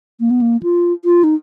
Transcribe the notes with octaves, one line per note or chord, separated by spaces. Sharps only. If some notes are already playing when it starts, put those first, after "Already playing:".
A#3
B3
A#3
F4
F4
D#4